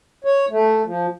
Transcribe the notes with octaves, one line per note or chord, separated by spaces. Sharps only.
C#5
A3
F3